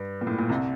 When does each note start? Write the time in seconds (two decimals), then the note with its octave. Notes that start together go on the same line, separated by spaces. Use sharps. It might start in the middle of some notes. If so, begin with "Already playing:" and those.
Already playing: G2
0.21 A#2
0.27 A2
0.38 A#2
0.49 C2 C3